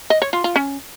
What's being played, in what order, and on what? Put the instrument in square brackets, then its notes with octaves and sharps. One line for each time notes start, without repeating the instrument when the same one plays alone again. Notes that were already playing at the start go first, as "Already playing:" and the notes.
[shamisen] D#5
C#5
F4
F4
C#4